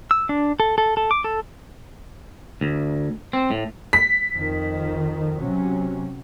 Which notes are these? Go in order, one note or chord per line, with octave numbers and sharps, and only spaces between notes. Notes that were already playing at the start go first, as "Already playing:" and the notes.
E6
D4
A4
A4
A4
D6
A4
D2
C4
A2
B6
F2 D#3
C3 F#3 C#4